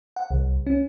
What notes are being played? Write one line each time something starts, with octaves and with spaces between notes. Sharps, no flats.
F#5
C2
C#4